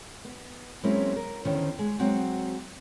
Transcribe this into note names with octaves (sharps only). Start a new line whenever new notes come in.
B3
F#3 G#3 A#3 C4 C#4 E4
A#4
E2 D3 D#3 C#4 C5
G#3 G#4
F#3 G#3 C4 F#4 F#5